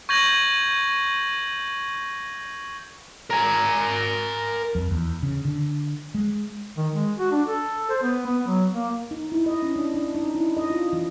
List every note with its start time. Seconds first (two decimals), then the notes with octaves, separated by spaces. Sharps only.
0.09 C#6 G6 G#6 A#6 F#7
3.30 A#4 G#5
4.75 F2
4.91 E2
5.23 C#3
5.45 D3
6.15 G#3
6.77 D#3
6.94 G#3
7.19 F#4
7.32 D4
7.47 A4
7.90 C5
8.03 B3
8.27 B3
8.47 F#3
8.74 A#3
9.11 D#4
9.32 E4
9.46 D#5
9.62 C#4
9.76 D4
9.94 D4
10.15 D#4
10.35 E4
10.57 D#5
10.70 F4
10.93 E3